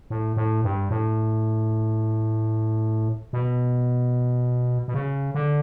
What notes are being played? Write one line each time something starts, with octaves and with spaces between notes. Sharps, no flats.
A2
A2
G2
A2
B2
B2
C#3
D3